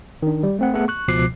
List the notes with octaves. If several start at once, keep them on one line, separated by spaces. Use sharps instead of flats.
D#3 D4
G3
A3 C4 F#5
A3 B3 G#4 A4 F#5
C#6 F#6
C#2 B2 F3 D6 F#6 C7